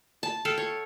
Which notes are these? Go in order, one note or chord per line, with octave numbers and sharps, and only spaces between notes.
A5
A4 F5 G5
C#5